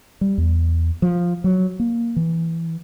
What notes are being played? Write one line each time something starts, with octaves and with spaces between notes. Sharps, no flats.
G3
E2
F3
F#3
A#3
E3